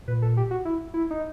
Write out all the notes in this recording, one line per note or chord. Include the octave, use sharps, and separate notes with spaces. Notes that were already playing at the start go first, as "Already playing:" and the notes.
A#2 B4
A4
G4
F#4
E4
E4
D#4